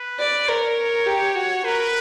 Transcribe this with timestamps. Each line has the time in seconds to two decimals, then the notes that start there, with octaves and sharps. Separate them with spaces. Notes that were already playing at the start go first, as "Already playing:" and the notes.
Already playing: B4
0.19 D5
0.48 A#4 C#5
1.06 G4
1.35 F#4
1.64 A#4 B4